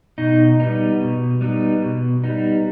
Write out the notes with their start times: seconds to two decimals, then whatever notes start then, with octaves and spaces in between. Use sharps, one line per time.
0.18 B2 D#4
0.60 G3 B3 D#4
1.01 B2
1.41 G3 B3 D#4
1.82 B2
2.24 G3 B3 D#4